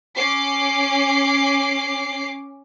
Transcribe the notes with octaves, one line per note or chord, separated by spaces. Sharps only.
C#4 D6 C7